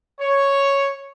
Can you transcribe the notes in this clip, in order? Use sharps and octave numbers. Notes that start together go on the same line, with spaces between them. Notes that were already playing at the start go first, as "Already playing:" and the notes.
C#5